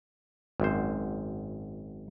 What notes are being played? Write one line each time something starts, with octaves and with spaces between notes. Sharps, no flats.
G#1 F#2 C5